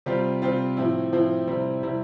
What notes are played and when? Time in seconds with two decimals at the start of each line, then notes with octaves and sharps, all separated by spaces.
0.06 C3 G3 C4 F4
0.42 C3 G3 C4 F4
0.77 A2 F3 C4 E4
1.12 A2 F3 C4 E4
1.47 C3 G3 C4 E4
1.83 C3 G3 C4 E4